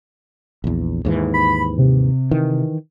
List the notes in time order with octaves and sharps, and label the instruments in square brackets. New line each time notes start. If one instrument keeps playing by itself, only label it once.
[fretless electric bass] A#1 E2
D#2 G#2 E3
[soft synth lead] B5
C3
[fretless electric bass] D#3 E3